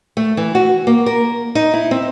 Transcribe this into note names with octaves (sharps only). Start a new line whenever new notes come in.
A3
E3
F#4
A#3
A#4
D#4
E4
C4